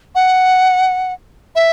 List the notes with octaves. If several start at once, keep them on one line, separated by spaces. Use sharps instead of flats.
F#5
E5